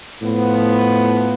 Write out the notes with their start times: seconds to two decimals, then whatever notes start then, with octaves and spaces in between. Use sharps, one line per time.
0.22 A2 F3 B3